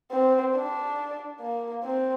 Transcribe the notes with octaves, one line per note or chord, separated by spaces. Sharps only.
C4
D4
A#3
C4